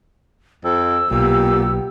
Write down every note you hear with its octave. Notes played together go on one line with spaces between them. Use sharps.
F2 E6
B1 A#2 B3 G4